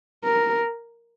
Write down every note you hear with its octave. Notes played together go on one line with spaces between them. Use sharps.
A#4